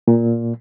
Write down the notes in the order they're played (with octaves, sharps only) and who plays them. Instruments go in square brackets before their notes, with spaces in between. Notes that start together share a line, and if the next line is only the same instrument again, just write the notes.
[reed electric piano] A#2